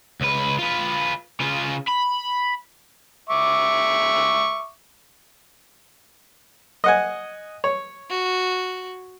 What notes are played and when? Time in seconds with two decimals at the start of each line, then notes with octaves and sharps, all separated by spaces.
0.21 C#2 B4
0.59 F4 B4
1.40 C#3 F4
1.88 B5
3.29 E5 C#6 D6
6.84 D#5 F#5 G#5
7.64 C#5
8.10 F#4